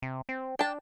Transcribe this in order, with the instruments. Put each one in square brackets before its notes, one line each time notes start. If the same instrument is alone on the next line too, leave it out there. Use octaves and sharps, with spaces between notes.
[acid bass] C3
C4
[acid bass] D4 [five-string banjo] G5 A5